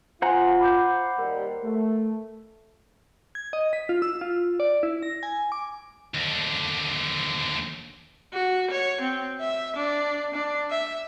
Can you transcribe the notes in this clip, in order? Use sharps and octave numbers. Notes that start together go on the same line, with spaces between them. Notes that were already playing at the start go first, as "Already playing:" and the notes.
F4 C5 F#5 G#5 A#5 C6
B5 D6 G6
D#2 G3 A#4
A3
G#6
D#5
B6
F4
E6
F4
D5
E4
A#6
G#5
D6
D#2 D3
F#4
C#5
C4
E5
D4
D4
E5